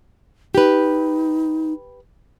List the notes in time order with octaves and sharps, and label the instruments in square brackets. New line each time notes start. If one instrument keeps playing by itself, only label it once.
[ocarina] D#4 [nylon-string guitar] G4 B4